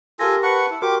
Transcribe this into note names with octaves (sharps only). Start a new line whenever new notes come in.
F4 G4 A4 A#4 G#5 A#6
B4 F#5 A5 C#6 C#7
E4
F#4 G4 A#4 C6 D6